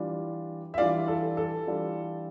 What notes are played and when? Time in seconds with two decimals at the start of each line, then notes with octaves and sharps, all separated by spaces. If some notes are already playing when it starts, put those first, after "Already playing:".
Already playing: E3 G3 D4 F4
0.74 E5
0.77 E3 G3 D4 F4 D5 F5
1.08 A4
1.37 A4
1.67 E3 G3 D4 F4